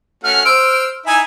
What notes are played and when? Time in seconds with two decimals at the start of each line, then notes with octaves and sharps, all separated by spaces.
0.24 A3 C#4 F#4 F6
0.45 C5 E6 F6 D7
1.06 D#4 E4 E5 G#5